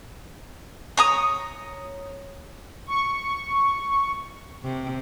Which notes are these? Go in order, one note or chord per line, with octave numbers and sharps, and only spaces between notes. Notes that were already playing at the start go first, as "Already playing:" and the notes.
C#5 A#5 D#6
C#6
C3